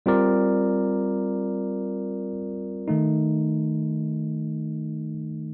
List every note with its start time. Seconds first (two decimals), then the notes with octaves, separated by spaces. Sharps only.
0.06 G3 C4 F4 A#4 D5
2.88 D#3 A3 D#4